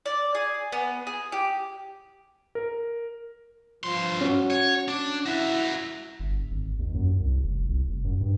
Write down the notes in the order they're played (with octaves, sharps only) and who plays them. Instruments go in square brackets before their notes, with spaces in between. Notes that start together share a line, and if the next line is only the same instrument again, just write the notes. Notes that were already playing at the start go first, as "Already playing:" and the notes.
[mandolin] D5
G#4
B3
G#4
G4
[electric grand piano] A#4
[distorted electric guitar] G2 C6 [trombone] F3
[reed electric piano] C#4 [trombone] F#4
[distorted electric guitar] C#5
D4
[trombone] E4 [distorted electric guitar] F#4 E5
[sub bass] G1
G#1
D#2
F#2
C2
F1
C2
F1
F#2
G2